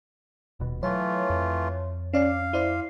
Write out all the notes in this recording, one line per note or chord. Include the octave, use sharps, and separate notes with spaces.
D#1 B2
E3 F#3 A3 F4 C#5
F2
C#4 D5 F5
E4 C5 D5